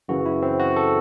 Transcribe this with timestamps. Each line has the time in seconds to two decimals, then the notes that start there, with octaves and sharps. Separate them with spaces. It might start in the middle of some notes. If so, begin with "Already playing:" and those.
0.08 F#2 C#3 E3 F#4
0.26 E4
0.42 C4
0.60 F#4
0.76 A4